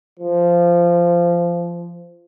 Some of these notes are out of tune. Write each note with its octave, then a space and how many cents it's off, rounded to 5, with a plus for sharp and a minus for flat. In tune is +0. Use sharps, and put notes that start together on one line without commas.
F3 -15